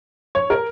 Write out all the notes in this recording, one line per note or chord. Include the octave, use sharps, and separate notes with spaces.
C#5
A#4